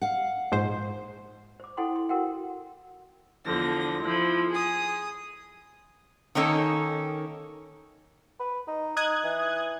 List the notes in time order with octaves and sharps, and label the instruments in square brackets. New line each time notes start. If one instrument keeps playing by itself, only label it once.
[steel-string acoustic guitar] F5 F#5
[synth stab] A#1 G#2 C5
[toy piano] C5 D6
E4 A4 C5 F#5 G5 C6
C6
F#4 A#4 C5 F#5 G5
[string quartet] E2 D3 F3 A#6
F3 E4
G#4 D#6
[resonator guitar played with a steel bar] D#3 A#3 C#4 D#4 A4
[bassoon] B4
D#4
[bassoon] D#4 [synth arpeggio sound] D#6 F#6 G#6
[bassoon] E3